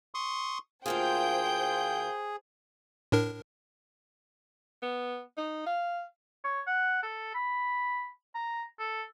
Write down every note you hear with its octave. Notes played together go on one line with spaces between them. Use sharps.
C6 C#6 D#6
D2 A#3 F4 G#4 C5 G5 G6
A2 D4 A#4
B3
D#4
F5
C#5
F#5
A4
B5
A#5
A4